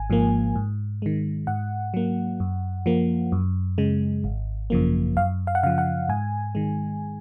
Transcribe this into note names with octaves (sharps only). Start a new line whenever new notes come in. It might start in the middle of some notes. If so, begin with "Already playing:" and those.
Already playing: G#1 G#5
G#2 F3 A#3
G#2
D#3 G#3
G#2 F#5
F#3 A#3
F#2
F3 A#3
F#2
C#3 G#3
G#1
F#2 C#3 F3 A#3
F#2 F5
F5
F#5
C#3 F3 F5
F#5
G#2 G#5
D#3 G#3